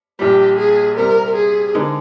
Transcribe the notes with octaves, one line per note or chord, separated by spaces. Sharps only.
A#1 A#2 G3 G4
G#4
C3 G3 C4 A#4
G#4
D3 G#3 C4 D#4 A#4